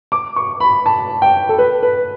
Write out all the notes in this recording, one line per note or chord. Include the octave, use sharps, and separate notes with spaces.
D6
C#6
B5
A5
G5
A4
B4
B4